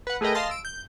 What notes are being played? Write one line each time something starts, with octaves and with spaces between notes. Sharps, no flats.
B4 F#5
A3 G#4 A#4 B4 D#5 G5
D#5 F5 A5 C6 A6 A#6
E6 D7
G6